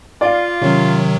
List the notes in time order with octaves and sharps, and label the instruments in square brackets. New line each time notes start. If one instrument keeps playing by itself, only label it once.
[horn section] F4 [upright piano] D5 F5
[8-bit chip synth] C3 D#3 F#3 [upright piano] C#4